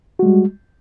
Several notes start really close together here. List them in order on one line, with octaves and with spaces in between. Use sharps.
F#4 G#3 G3